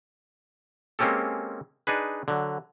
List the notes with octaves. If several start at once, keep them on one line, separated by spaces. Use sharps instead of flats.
G#3 A#3 C4 C#4 G4 A4
D4 D#4 G#4 B4
D3 F#3